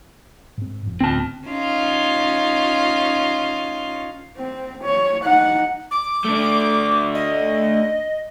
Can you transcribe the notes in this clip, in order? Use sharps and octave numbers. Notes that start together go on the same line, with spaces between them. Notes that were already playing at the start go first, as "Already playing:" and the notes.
G#2 C4
F1
D2 A2 C4 A5
C#4 D#4 F4
C4
C#5
D#4 F#5
D6
A3 D4
D#5